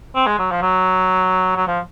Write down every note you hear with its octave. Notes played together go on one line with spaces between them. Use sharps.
C4
G#3
F#3
F3
F#3
F#3
F3